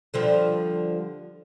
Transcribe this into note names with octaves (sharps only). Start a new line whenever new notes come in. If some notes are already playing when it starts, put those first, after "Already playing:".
D3 F3 G3